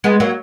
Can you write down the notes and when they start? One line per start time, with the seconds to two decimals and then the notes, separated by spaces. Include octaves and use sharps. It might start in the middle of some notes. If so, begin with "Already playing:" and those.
0.04 G#3 B3
0.20 F#3 A#3